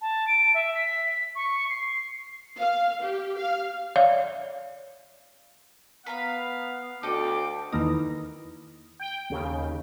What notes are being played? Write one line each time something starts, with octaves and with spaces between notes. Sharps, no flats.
A5
D7
E5
B6
C#6
C7
F5
G4
F5
C#5 D5 E5 F5
B3 B4 F5 A#5 B5
D2 A4 D#5 G5 D6
E2 D#3 A#3 D#4
G5
D#2 C#3